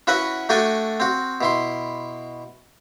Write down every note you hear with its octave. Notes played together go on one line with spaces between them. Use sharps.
C#4 E4 F#4 B4 E5 F#5
A3 D4 F#4 A4 G5 G#5
C4 F#4
B2 E4 C6